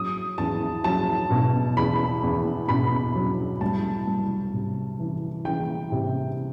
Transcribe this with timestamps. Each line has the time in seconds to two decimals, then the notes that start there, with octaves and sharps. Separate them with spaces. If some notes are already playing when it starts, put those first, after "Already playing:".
Already playing: F#3 D#6
0.38 E2 A5
0.84 F#3 A5
1.30 B2
1.77 E2 B5
2.23 E2
2.69 B2 B5
3.15 F#3
3.61 C2 A5
4.07 C2
4.53 C3
4.99 E3
5.45 E3 G5
5.92 C3